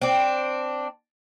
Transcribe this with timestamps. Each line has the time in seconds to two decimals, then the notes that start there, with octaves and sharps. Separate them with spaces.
0.02 C4 D4